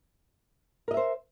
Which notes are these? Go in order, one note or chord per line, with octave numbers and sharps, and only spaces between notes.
A#4 C5 D#5 E5